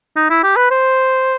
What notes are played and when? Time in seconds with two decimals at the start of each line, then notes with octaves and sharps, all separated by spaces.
0.16 D#4
0.30 E4
0.43 G4
0.56 B4
0.71 C5